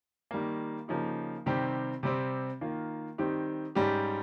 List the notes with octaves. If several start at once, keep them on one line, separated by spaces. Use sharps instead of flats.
D#3 G3 A#3
C#3 F3 A#3 D#4 G4
C3 D#3 G3 C4 G4
C3 G3 C4
D#3 A#3 F4
D#3 G3 C4 D#4 G4
G#2 G3 C#4 G4